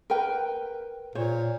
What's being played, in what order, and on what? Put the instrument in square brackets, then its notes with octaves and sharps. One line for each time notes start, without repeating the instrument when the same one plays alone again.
[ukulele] A#4 B4 G5
[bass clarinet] A#2 [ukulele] C5 C#5